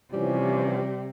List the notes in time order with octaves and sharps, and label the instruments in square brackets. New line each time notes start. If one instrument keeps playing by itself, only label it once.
[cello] C3 [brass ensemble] E3 F3 C#4 [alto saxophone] G3